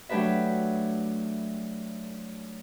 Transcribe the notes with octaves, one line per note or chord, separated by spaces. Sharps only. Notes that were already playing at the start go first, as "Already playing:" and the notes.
F#3 A3 D4 G4 B4 E5